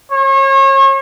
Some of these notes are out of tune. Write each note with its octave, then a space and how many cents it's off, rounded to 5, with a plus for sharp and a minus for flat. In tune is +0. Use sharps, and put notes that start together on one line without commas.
C#5 -35